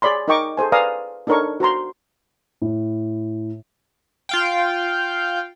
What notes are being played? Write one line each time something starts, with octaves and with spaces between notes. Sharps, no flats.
G#4 C#5 D5 B5 C6
D#4 A#4 D#5 G5 C#6 D6
G#4 A4 C5 G#5
B4 D5 F5 G#5 A#5 D#6
D4 D#4 A4 A#4 C#5 C#6
F#4 C5 A#5 C6
A2
F4 F5 G5